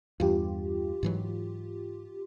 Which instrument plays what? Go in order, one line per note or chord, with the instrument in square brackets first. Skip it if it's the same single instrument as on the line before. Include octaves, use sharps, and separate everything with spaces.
[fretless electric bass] E2 G2 [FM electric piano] F4 G4
[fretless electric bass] G#2 E3 F#3